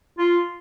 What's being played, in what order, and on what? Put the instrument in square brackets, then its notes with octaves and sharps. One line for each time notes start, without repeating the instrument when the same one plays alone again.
[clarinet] F4